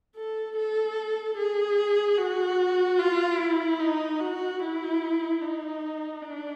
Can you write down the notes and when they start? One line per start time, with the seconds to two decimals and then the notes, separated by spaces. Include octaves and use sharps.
0.15 A4
0.56 A4
1.37 G#4
2.17 F#4
2.99 F4
3.39 E4
3.79 D#4
4.20 F#4
4.60 E4
5.41 D#4
6.22 D4